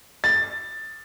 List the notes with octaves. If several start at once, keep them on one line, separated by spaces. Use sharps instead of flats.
A6